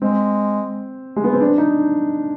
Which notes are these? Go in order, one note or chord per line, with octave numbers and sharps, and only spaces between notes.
G#3 C4
G#3
B3
C4
D4
D#4